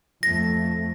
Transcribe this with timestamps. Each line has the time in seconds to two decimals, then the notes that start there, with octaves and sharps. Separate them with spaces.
0.23 F2 A3 A#6